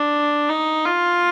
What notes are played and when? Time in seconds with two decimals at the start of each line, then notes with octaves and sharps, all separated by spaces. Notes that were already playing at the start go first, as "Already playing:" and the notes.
Already playing: D4
0.49 D#4
0.85 F4